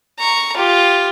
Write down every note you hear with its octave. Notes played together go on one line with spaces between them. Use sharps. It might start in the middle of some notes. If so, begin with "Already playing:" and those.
A#5 C#6
F4 G4